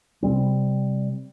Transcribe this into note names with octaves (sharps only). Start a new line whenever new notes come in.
C3 G3 C4